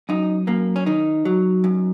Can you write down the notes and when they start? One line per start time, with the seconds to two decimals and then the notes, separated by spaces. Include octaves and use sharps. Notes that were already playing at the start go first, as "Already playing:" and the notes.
0.09 F#2 D#4
0.47 F#2 A#3
0.76 C#4
0.86 D#3 D#4
1.25 F#3
1.64 F#2